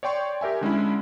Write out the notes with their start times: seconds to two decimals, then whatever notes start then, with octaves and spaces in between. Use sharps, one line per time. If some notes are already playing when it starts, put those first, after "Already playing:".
0.03 C#5 D5 G5 C6 C#6
0.41 G4 A#4 E5 G#5
0.61 D3 G#3 C#4 E4